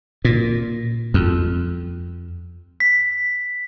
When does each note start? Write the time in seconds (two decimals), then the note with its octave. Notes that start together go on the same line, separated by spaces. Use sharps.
0.25 A#2
1.14 F2
2.80 B6